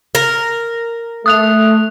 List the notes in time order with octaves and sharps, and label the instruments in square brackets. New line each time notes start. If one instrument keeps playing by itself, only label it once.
[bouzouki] A#4
[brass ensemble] A3 [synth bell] D#6 F#6 F7